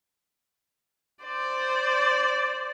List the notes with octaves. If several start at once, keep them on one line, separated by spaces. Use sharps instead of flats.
C5 D5